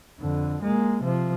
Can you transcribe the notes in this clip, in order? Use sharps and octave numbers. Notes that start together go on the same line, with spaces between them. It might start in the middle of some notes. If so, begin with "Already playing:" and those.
F2 D3
G#3 A#3
C3 F3